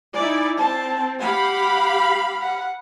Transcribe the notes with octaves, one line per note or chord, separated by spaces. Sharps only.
D#4 E4 D5 G#5
C4 A5
G4 F5 F#5 B5
F#5